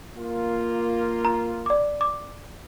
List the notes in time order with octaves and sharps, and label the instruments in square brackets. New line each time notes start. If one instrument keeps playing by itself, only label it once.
[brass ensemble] A#3 F4
[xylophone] A#5
D5 D6
D6